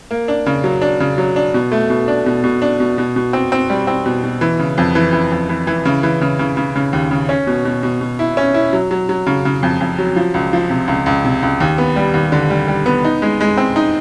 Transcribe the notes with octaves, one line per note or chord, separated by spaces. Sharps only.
A#3
D4
C#3
F#3
D4
C#3
F#3
D4
B2
A3
B2
D4
B2
B2
D4
B2
B2
B2
C4
C4
G3
C4
B2
B2
E3
C#3
F2
E3
E3
F2
E3
E3
C#3
E3
C#3
C#3
C#3
C#3
D#2
C#3
C#4
B2
B2
B2
B2
E4
C#4
E4
F#3
F#3
F#3
C#3
C#3
F2
F2
F#3
F3
C#2
F3
C3
C#2
C#2
C3
C#2
D#2
B3
G3
D#2
D3
G3
G3
B3
D#4
G#3
G#3
C4
D#4